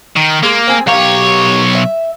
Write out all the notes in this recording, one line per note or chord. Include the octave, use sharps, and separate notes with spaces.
D#3
G#3 A#3
C4 G#4
B1 G4 A#4 C#5 F5
E5